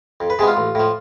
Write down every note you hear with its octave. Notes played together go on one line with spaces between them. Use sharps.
F2
B4
C3 G#3 B3 G#4
F4
A1
A2 F3